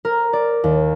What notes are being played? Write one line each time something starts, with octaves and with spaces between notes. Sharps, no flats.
A#4
D5
D#2